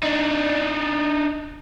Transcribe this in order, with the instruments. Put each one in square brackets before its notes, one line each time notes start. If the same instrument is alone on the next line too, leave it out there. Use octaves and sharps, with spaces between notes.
[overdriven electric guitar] D4 D#4